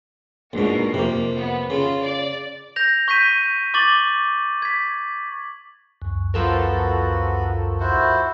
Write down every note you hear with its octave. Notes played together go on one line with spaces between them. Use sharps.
A#1 G#2 B2 A#4
F2 C3 A#3
B3
C#3 F4
D5
G6 A#6 F7
C#6 G6 B6 D#7
C#6 D6 A6 F#7
G#6 B6
C#2 F#2
F3 B3 F#4 A4 A#4
E4 F#4 C5